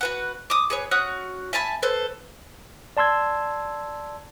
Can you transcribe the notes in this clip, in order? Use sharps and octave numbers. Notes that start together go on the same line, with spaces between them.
F#4 B4 F#5
D6 D#6
G#4 B4 C#5
C#4 F#4 D#6 F#6
E5 G#5 A5 B5
A4 B4 C5
D5 A5 C6 E6 G#6